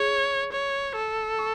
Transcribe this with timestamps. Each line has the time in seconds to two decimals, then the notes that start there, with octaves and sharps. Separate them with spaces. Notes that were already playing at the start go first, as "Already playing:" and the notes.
Already playing: G#4 C#5
0.53 C#5
0.96 A4
1.39 C#6